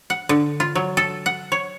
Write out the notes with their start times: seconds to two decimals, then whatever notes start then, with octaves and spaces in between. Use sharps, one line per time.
0.10 F#5
0.29 D3
0.60 F4
0.75 F#3
0.97 A4
1.26 F#5
1.52 C#5